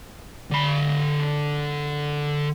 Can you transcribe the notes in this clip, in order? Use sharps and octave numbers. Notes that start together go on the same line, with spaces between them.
D3 B5